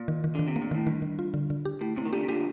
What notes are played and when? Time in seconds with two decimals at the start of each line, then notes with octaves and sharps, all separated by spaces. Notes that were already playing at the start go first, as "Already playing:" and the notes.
Already playing: A#2
0.08 D#3
0.24 D#3
0.35 D3 D#3
0.48 C3
0.56 A#3
0.62 A#2
0.71 A2 D#3
0.87 G2 D#3
1.02 D#3
1.19 F4
1.34 D3
1.50 D3
1.65 G4
1.81 A2 G4
1.96 A2 C3 C4
2.05 D#3
2.13 A#2 D3 G4
2.23 C3
2.29 A#2 D3 G4